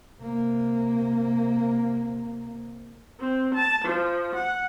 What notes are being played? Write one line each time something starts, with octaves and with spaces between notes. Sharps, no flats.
C3 A#3
C4
A5
F3
F#5